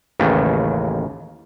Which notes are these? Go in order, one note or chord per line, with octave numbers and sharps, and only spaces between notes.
A1 D#2 C#3